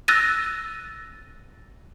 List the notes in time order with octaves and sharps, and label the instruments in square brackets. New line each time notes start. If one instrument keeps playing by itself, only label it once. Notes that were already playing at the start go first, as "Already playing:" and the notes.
[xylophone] E6 F#6 A6 A#6 D#7